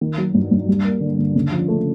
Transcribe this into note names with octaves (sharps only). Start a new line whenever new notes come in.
D#3
F#3
G2
G2
G3
A#3
D3
D3
C#3
F3
A3